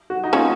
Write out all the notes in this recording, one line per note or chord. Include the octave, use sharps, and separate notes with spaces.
F#4
D#4
A#3 C#4 F4